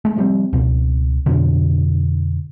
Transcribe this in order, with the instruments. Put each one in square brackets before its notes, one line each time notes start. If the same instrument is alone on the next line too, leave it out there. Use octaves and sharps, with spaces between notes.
[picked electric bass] G#3 A3
F3 G3 C4
C#2 B2
F2 B2 D3